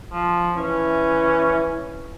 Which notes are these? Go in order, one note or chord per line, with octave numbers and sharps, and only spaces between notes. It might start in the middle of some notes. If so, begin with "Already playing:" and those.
F3
E3 C#4